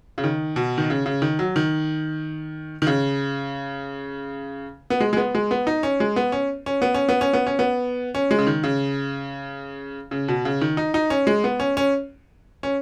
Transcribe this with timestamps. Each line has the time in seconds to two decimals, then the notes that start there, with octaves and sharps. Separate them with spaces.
0.18 C#3
0.24 D#3
0.56 B2
0.78 D#3
0.90 C#3
1.06 C#3
1.22 D#3
1.39 F#3
1.56 D#3
2.82 D#3
2.87 C#3
4.90 B3
5.00 G#3
5.13 G#3
5.17 B3
5.35 G#3
5.51 B3
5.67 D#4
5.83 C#4
6.00 G#3
6.16 B3
6.32 C#4
6.66 C#4
6.82 B3
6.94 C#4
7.09 B3
7.21 C#4
7.33 B3
7.47 C#4
7.59 B3
8.15 C#4
8.31 G#3
8.38 C#3
8.47 D#3
8.63 C#3
10.11 C#3
10.28 B2
10.45 C#3
10.61 D#3
10.77 D#4
10.94 D#4
11.10 C#4
11.27 G#3
11.44 B3
11.60 C#4
11.77 C#4
12.63 C#4